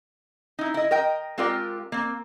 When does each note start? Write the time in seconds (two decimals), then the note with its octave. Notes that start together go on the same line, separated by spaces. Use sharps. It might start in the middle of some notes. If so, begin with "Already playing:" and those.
0.59 D#4 E4
0.74 E4 D#5
0.91 A#4 D#5 G5
1.38 G#3 C4 F4 G4 A#4 D5
1.92 A#3 C4